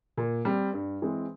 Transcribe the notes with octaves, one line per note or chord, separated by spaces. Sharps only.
A#2
G3 C4
G2
E3 G#3 C4